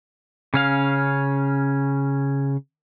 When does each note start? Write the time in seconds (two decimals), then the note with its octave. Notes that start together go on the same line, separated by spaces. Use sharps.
0.54 C#3 C#4 F5